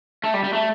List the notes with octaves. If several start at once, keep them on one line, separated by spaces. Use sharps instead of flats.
A3
G3
G3
A3